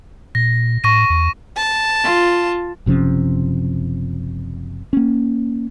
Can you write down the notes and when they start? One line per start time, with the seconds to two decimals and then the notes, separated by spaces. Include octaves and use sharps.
0.35 A#2 A#6
0.84 A2 C#6 A#6 D#7
1.10 E2
1.56 A5
2.03 F4
2.86 F#1 C3 F3 C#4
4.93 A#3 C#4